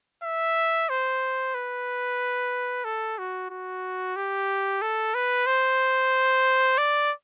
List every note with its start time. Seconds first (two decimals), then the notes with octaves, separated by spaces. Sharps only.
0.23 E5
0.89 C5
1.55 B4
2.84 A4
3.18 F#4
3.50 F#4
4.16 G4
4.81 A4
5.14 B4
5.46 C5
6.78 D5